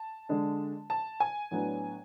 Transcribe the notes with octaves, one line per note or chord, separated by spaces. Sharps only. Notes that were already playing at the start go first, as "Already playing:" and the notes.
Already playing: A5
D3 G#3 D4
A5
G#5
A2 F#3 B3 D4